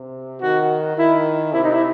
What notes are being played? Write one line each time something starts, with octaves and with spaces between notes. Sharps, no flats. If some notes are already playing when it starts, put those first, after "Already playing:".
Already playing: C3
D#3 F#4
D#3 E4
C3 E4
D#4
E4